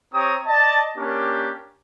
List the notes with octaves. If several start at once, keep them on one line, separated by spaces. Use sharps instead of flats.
C4 G4 C#5 A#5 D#6
D5 D#5 A5
A#3 C#4 D4 G4